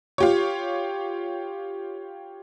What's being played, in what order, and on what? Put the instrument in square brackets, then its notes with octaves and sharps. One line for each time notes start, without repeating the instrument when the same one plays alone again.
[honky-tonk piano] F4 G4 C#5